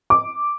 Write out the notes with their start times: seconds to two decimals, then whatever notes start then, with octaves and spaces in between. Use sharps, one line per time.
0.10 D6